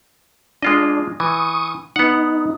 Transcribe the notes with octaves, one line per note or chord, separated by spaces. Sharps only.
G#3 D4 F4 D#5
E3 C#6 D#6
B3 D#4 F#5